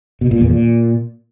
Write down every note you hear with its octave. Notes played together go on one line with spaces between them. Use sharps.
B2
A#2
E2
A#2